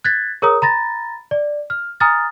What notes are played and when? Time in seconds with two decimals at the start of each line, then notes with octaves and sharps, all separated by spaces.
0.04 F#6 G#6 A6 B6
0.42 G#4 A#4 C#5 A#5 D#6
0.62 A#5 B5 A6 A#6
1.31 D5
1.70 F6
2.00 G#5 A#5 D#6 F6 A6